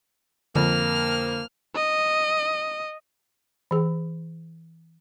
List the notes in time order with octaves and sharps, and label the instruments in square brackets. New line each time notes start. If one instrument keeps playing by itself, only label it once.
[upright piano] F2 [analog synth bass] D3 [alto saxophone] A#3 [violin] F6
[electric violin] D#5
[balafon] E3 G#4